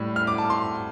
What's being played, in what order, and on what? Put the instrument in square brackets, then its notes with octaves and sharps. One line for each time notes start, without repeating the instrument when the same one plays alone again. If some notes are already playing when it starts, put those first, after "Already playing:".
Already playing: [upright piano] A2 G3
F6
D6
A5
C6